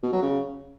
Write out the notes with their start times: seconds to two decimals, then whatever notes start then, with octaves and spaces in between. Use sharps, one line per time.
0.03 B2
0.12 F#3
0.22 C#3